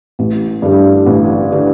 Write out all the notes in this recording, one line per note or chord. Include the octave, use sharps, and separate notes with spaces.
A1
G2 D3
A1
D3